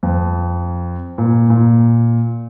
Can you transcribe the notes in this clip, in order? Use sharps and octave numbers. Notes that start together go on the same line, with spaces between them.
F2
A#2
A#2